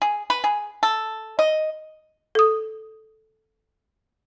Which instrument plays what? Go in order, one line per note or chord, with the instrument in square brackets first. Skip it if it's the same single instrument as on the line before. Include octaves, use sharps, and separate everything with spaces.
[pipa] G#4
B4
G#4
A4
D#5
[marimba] A4 D#6